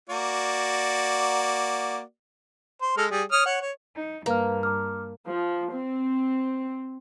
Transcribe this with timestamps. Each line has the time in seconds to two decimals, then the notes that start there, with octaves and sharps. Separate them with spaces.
0.10 A#3 F#4 D5
2.82 C5
2.97 G#3 A4 F6
3.11 G3 G#4
3.32 C#5 D#6 F6
3.46 C#5 F#5
3.61 C#5
3.95 D#4
4.26 G2 A#3 B4 F5 F6
4.63 A#5 D6 F6
5.29 F3
5.73 C4